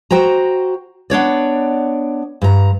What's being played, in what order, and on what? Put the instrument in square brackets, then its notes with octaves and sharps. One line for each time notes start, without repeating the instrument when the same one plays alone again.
[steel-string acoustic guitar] F#4 C5 G5 A#5
B3 D4 C#5 D5
G2 A#5